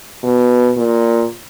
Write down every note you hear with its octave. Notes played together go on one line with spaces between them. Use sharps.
B2
A#2